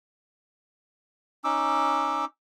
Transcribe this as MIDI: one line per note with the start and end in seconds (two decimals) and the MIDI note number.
1.44 2.25 61
1.44 2.25 63
1.44 2.25 86
1.44 2.25 88